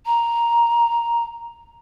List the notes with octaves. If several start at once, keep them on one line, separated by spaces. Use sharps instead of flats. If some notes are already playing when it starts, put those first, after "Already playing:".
A#5